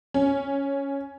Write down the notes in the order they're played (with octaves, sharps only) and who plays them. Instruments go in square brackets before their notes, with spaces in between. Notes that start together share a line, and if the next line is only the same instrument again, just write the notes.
[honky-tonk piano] C#4